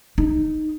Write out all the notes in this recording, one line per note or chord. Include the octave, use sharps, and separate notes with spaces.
D#4